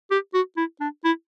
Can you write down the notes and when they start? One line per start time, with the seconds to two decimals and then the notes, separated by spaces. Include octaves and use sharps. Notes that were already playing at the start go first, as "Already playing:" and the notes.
0.11 G4
0.34 F#4
0.57 E4
0.81 D4
1.04 E4